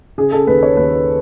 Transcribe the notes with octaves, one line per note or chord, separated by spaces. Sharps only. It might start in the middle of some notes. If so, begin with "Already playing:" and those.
C#3 G#4
A4
D#2 B4
C#5
D#2 B4